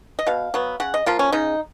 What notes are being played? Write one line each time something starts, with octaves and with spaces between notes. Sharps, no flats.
D#5
B2 F5
F#3 B3
C#3 F#5
D#5
F3 A#3 F4
C#4
C#3 D#4